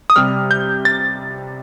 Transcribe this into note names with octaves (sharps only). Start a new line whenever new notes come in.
D#6
C3 G3 F6
G6
A6